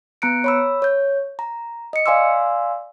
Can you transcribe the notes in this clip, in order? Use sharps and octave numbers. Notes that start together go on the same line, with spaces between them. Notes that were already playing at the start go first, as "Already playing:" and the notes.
B3 A#5 F#6 C#7 D7
C#5 B5 E6
C#5 G6
A#5
D#5 C#7
D5 F5 G#5 C6 D6 E6